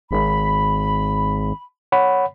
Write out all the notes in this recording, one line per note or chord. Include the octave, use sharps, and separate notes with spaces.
G#1 B5
C#5 F#5 B5